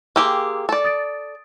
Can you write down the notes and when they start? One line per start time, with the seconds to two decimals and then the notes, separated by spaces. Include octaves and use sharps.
0.16 A#3 G4 G#4 G5 C6 E6
0.69 A4 D5
0.84 D#6 A6 D7